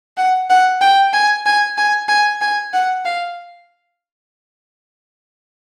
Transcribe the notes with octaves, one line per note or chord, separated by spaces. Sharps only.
F#5
F#5
G5
G#5
G#5
G#5
G#5
G#5
F#5
F5